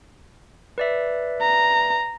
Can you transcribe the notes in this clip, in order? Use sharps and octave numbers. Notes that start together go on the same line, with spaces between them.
B4 D5 E5
A#5